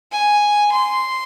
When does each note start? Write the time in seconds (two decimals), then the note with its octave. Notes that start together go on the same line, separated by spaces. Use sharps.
0.12 G#5
0.72 C6